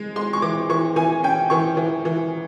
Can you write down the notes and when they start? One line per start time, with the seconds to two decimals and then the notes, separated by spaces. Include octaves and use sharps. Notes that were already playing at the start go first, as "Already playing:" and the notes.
Already playing: G#3
0.16 G#3 C6
0.33 C#6
0.42 E3 D6
0.70 E3 C#6
0.96 E3 G#5
1.23 C#4 G5
1.50 E3 C#6
1.77 E3
2.05 E3